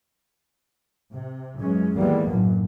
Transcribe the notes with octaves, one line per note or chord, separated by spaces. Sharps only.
C3
F#2 E3 G#3 C#4
D#3 E3 G3 G#3 A#3 B3
F#1 B1 F#2 A2